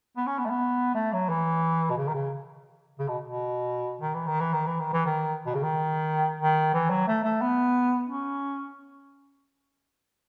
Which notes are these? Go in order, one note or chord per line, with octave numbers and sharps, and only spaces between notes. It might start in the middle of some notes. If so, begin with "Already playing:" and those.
B3
C#4
B3
A3
B3
A3
F#3
E3
B2
C#3
D#3
C#3
C#3
B2
B2
D#3
E3
D#3
E3
D#3
E3
D#3
E3
D#3
B2
C#3
D#3
D#3
E3
F#3
A3
A3
B3
C#4